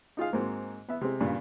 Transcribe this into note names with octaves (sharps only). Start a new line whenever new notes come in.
D#4 F4 G#4 F5
G#2 G#3 A#3 C4 F#4
B3 E5
C3 G#3 C4
G2 A#2 C#3